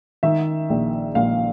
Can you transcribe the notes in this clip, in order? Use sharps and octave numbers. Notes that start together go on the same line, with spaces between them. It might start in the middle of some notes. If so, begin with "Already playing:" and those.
D#3 E5
A#1
A#1 F5